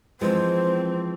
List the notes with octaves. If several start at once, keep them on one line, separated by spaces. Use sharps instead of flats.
E3 F3 G#3 C4 C5